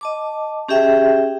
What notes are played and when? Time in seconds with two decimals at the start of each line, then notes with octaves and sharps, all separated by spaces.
0.01 D#5 A5 D6
0.69 C#4 G4 G#4 E5 G5